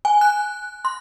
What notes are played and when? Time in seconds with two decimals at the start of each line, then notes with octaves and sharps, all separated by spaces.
0.05 G#5
0.21 F#6
0.85 C6